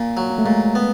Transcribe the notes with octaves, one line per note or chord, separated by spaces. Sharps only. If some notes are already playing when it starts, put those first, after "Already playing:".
Already playing: A#2
F#3
A#3
A3
A#2 G#3
B3